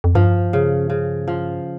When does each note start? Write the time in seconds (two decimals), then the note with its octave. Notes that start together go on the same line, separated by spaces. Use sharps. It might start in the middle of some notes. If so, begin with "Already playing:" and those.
0.04 F2
0.15 G2 F3
0.53 C#3
0.90 C#3
1.28 F3